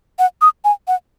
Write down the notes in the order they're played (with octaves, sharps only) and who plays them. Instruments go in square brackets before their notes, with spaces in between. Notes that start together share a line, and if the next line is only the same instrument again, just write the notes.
[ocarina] F#5
D#6
G#5
F#5